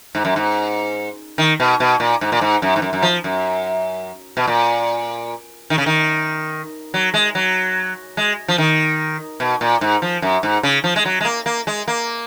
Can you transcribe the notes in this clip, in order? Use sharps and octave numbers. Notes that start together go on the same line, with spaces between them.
G#2
F#2
G#2
D#3
B2
B2
A#2
G#2
A#2
G#2
F#2
G#2
F#2
F#2
F3
F#2
B2
A#2
D#3
C#3
D#3
F#3
G#3
F#3
G#3
F3
D#3
B2
A#2
G#2
F3
F#2
G#2
C#3
F3
G#3
F#3
G#3
A#3
A#3
G#3
A#3